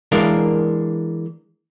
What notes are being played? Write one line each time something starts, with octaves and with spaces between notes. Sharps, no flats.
E3 G#3 A#3 D4 A#4